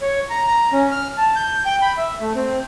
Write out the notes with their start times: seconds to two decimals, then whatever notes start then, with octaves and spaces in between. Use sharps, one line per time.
0.01 C#5
0.30 A#5
0.47 A#5
0.72 C#4
0.91 F6
1.17 A5
1.36 G6
1.66 G5
1.82 B5
1.97 E5
2.20 A3
2.35 C4